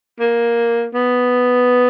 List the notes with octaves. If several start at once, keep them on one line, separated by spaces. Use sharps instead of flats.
A#3
B3